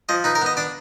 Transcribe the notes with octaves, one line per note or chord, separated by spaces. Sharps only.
F3 D#5
D#4 B4
A#4
B3 D#5
D4 D5